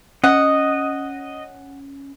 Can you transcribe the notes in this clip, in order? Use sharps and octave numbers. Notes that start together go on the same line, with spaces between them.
C#4 D#5 F#5